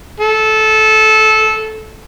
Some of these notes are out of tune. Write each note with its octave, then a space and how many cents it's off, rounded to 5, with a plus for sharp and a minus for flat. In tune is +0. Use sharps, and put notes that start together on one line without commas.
A4 -15